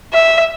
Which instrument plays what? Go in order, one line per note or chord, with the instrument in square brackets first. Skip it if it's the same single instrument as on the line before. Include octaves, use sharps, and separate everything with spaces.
[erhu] E5